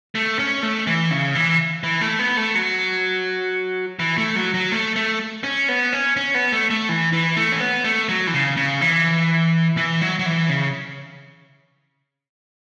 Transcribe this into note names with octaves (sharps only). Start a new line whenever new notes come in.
A3
C#4
A3
E3
C#3
E3
E3
A3
B3
A3
F#3
E3
A3
F#3
F#3
A3
A3
C#4
B3
C#4
C#4
B3
A3
A3
E3
E3
A3
C#4
B3
A3
F#3
E3
C#3
C#3
E3
E3
F#3
F#3
E3
C#3